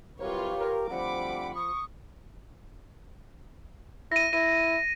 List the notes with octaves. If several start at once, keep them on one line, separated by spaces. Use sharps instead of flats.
C2 F#3 F4 G4 A#4 B4 C#5
A#4
D2 F3 G3 C4 F#5 B5 D6
C#6 D#6
E4 A#6 D#7
E4 D#7